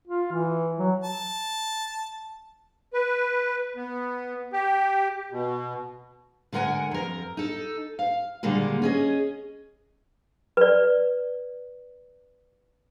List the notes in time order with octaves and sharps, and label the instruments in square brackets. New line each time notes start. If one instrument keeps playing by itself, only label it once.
[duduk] F4
E3
F#3
[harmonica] A5
[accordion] B4
B3
G4
B2
[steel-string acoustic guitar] D3 G#3 A#4 F#5 G#5
F2 A#4
D#4 A4
F5
A#2 D3 D#3 G3 G#3 A#3
C#4 G#4 D#5
[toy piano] B4 D5